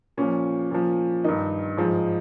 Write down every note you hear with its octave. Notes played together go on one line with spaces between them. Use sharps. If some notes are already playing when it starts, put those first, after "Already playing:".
A#2 F3 C#4
A#2 F3
G2 D#3 D#4
G#2 F3